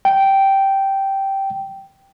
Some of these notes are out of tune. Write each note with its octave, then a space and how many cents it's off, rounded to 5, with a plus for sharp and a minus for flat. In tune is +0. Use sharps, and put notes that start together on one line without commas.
G5 -10